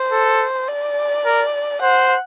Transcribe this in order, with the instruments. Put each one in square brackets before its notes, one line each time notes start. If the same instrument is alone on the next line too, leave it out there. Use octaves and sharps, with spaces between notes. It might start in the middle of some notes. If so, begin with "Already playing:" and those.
Already playing: [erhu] C5
[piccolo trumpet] A4
[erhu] D5
[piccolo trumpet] A#4
[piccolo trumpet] C5 [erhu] F#5